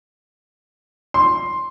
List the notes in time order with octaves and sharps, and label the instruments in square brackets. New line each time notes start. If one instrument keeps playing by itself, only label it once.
[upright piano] C6